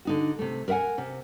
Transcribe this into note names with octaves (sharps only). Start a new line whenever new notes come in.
D3 D#4 F#4
C3 A3
A#4 B4 E5 F#5 G#5
C3